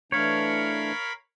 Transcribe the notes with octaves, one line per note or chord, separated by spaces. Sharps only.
E3 A3 D4 A#4 C#5 F5 B5